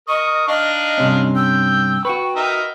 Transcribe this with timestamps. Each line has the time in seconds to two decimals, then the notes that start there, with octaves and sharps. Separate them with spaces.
0.08 A#4 D#5 C#6 D#6
0.48 D4 D#4 D#5 F5
0.98 G2 C3 C#4
1.36 G5 E6
2.05 F#4 B4 G5 C#6
2.36 D#4 A#4 E5